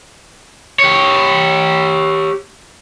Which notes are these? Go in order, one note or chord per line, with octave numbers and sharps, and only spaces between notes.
G4 C#5